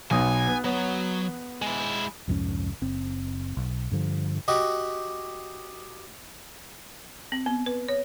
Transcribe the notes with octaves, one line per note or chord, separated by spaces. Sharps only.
B1 B3 G#5 D#6
B3
F#3 B3
G#3 E4
C2 F2 G#2 C#4
F#1 C4
B1
G2 D3 F3
F#4 G4 D#5
C4
B3
B4
C#5